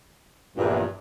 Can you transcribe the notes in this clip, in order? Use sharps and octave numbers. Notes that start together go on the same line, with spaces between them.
A#1 E2 G2 A#2